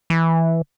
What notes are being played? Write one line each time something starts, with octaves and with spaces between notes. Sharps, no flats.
E3